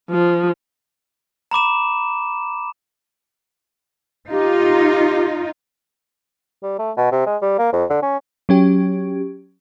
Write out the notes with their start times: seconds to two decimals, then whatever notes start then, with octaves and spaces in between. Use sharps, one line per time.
0.10 F3
1.51 A#5 B5 D6 E7
4.30 D#4 F4 G4
6.63 G3
6.79 A3
6.97 B2
7.12 C3
7.26 G#3
7.42 G3
7.58 A#3
7.73 F2
7.90 D3
8.02 C#4
8.49 F#3 C#4 G4